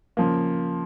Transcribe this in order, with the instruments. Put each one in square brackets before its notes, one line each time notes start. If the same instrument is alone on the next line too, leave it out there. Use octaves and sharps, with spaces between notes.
[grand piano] C#3 F3 A#3